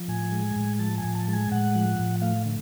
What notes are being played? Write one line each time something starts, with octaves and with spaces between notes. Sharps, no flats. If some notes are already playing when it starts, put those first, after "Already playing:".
Already playing: F3
A2 G#5
G#3
A2
F3 A5
G#5
A2
A5
G#3 A5
G#5
A2 F#5
F3
A2
A3 F5
D3